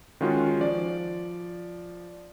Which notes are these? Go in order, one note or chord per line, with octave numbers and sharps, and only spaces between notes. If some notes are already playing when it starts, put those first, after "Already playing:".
D#3 G#3 C#4 F4 F#4
F3 D5